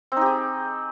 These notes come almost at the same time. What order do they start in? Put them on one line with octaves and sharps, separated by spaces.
C4 D#4 G4 G#4